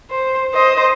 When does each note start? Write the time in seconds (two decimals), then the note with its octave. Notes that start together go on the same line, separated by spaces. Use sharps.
0.10 C5
0.54 C5 D#5